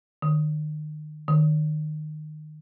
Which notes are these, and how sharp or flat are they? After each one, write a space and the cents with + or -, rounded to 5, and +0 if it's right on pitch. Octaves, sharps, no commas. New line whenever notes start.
D#3 -35
D#3 -25